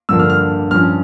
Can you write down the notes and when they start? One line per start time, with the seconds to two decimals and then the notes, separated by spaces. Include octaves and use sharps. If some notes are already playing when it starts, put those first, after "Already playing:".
0.09 G2 D3 F3 A#3 D4 E6
0.19 F6
0.30 F6
0.71 G2 F3 C#4 F6